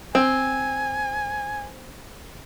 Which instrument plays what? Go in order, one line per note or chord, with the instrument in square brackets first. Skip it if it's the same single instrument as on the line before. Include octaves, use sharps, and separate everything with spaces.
[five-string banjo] C4 [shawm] G#5